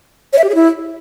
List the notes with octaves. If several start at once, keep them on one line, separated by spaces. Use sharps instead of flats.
C#5
E5
G4
G#4
E4